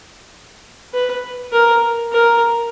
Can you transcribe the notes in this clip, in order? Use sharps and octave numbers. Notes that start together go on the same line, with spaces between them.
B4
A#4
A#4